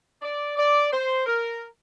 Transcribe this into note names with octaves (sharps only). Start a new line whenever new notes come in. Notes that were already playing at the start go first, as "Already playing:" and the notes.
D5
D5
C5
A#4